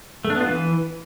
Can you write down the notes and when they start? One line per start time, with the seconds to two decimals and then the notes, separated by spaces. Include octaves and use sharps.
0.25 A3
0.30 D4
0.35 B3
0.41 F4
0.46 E3